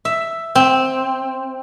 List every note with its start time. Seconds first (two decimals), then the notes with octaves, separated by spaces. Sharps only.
0.05 E5
0.55 C4